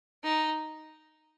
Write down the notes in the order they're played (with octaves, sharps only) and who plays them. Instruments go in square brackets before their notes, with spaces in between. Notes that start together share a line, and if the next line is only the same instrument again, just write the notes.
[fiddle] D#4